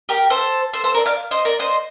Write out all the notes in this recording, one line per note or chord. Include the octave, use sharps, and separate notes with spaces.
G4 A#4
A4 C5
A4 C5
A4 C5
A#4 D5
D5 F5
C5 D#5
A#4 D5
C5 D#5